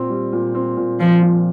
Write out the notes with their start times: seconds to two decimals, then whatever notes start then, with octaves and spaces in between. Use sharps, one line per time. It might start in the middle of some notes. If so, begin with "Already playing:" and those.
Already playing: A#2 C4
0.10 G3
0.33 A#2
0.55 C4
0.77 A#2
1.00 F3 C4
1.22 A#2